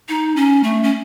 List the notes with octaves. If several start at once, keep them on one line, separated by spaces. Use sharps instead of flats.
D#4
C#4
A3
C#4